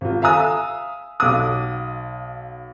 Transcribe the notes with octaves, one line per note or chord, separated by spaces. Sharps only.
G#1 F4
E5 F5 G#5 A#5 D#6 E6
B1 F5 D6 D#6